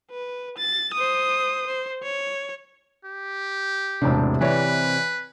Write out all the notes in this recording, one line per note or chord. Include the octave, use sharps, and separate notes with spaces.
B4
A6
C5 D#6
C5
C#5
G4
E1 A2 C3 D4
E3 B4 C#5 D5